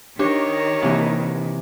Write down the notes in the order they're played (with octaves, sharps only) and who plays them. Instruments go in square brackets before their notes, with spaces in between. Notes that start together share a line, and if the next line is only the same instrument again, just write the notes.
[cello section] D#3 [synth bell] D4 G4 D6 [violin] C#5
[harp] C3 E3 [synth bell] A#3 C4